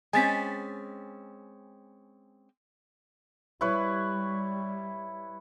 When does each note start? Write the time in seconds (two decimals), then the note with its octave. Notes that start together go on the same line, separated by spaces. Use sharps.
0.13 G#3 C4 C#4 G#5 A6 B6
3.61 G3 E4 B4 C#5